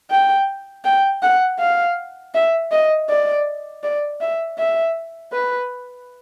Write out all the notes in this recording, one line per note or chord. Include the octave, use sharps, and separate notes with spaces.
G5
G5
F#5
F5
E5
D#5
D5
D5
E5
E5
B4